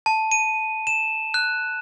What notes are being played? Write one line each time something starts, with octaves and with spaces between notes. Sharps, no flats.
A5
D#7
E7
F#6